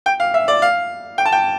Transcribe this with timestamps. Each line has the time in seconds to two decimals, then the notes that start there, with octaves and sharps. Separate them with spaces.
0.06 G5
0.20 F5
0.34 E5
0.48 D5
0.62 F5
1.18 G5
1.25 A5
1.32 G5